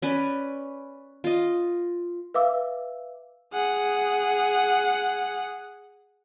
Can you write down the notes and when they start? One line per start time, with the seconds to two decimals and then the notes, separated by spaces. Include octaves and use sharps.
0.02 C#4 B4 D5
1.24 F4 D#5
2.34 B4 E5 F5 D6 E6
3.53 G#4 F#5